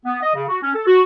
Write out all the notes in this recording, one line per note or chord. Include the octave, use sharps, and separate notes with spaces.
B3
D#5
C#3
F#4
C#4
A4
F#4